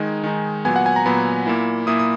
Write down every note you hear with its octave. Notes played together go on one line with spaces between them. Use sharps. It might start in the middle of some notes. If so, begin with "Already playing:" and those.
Already playing: D#3 G#3 D#4 G#5
D#3 G#3 D#4
A#2 F#3 B3 G#5
F#5
G#5
A#5
A#2 F#3 B3 B5
A#2 A#3 E4
A#2 A#3 E4 D#6
D#6